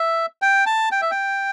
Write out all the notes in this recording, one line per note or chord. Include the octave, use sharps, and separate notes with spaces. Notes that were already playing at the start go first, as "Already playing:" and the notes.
Already playing: E5
G5
A5
G5
E5
G5